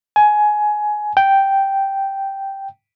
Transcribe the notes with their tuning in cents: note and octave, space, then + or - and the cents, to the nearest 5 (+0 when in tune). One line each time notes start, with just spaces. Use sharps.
G#5 +15
G5 -5